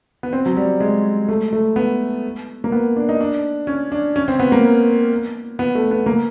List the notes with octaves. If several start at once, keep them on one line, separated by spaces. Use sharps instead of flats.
B3
C4
F#3
G3
G#3
A3
A3
B3
A#3
B3
D4
D#4
D4
C#4
D4
C#4
C4
B3
A#3
B3
A3
B3
A#3